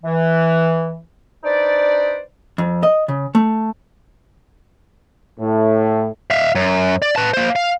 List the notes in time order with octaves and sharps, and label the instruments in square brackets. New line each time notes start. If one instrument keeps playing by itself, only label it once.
[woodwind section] E3
D4 D#4 B4 C5 D5
[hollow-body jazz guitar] F2
D#5
C#3
A3
[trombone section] A2
[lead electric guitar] E5 F5
F#2
D5
B4 A5
A#3 C5
F5